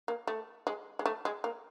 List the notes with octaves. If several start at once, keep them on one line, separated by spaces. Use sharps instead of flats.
A#3
A3
G#3
G#3
A3
G#3
A#3